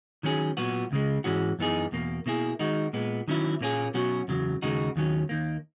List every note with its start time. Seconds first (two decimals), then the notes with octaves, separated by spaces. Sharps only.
0.23 D#3 F#3 C#4 G#4
0.57 A#2 F#3 B3 F#4
0.91 C#2 C#3 G#3
1.24 G#2 E3 G#3 C#4 F#4
1.59 F#2 E3 B3 D#4 G#4
1.92 E2 B2 A#3
2.26 B2 A#3 E4 G#4
2.59 D#3 G#3 D#4 F#4
2.93 A#2 G#3 B3
3.28 D#3 F#3 C#4 E4
3.61 A#2 A#3 C#4 G#4
3.94 B2 F#3 C#4 F#4
4.28 E2 C#3 F#3
4.62 D#2 C#3 G#3 D#4 F#4
4.96 D#2 D#3 F#3 C#4
5.29 D#2 D#3 A#3